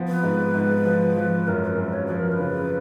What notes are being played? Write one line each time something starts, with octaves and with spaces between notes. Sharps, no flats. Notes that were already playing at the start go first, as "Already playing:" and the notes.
Already playing: F3 B3
B4
G#2
G#2
F3
F3
F#2 A#4
A#4
F#2 B4
C#5
F3 B4
A#4
B4
C#3